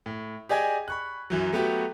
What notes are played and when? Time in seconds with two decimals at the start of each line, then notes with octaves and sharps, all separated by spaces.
0.06 A2
0.49 G4 G#4 D5 D#5 G#5 G#6
0.88 B5 C#6 F#6
1.30 F#2 E3 F#3
1.53 F#3 A3 B3 F#4 G4